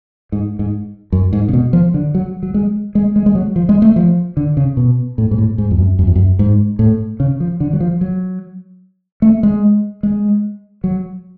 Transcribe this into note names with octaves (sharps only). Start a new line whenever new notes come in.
G#2
G#2
F#2
G#2
C#3
B2
F3
D3
F#3
F#3
G#3
G#3
G#3
G#3
F#3
F3
G#3
A3
F3
D3
C#3
B2
A2
G#2
A2
G#2
F2
F#2
F#2
F2
F#2
G#2
A2
C#3
F3
D3
F#3
F3
F#3
A3
G#3
G#3
F#3